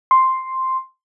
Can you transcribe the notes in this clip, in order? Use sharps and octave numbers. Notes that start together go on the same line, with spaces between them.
C6